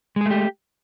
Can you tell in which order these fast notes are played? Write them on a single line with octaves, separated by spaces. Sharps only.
G#3 G#4 A3 G4